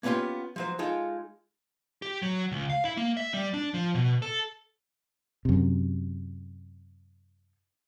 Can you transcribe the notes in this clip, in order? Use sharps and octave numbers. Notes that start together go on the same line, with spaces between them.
A#3 B3 C#4 D4 F4 G4
F3 F#3 C5
G#3 D#4 F4 A4
G4
F#3
C#2
F5
E4
A#3
E5
G3
D4
F3
B2
A4
F#2 C3